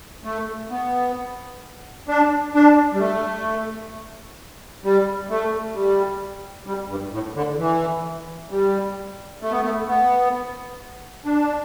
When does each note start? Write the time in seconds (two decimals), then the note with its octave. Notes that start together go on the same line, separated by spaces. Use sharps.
0.24 A3
0.71 B3
2.08 D4
2.54 D4
2.94 G3
3.00 A3
4.84 G3
5.30 A3
5.75 G3
6.67 G3
6.89 G2
7.12 A2
7.36 D3
7.59 E3
8.50 G3
9.42 A3
9.51 B3
9.61 A3
9.87 B3
11.25 D4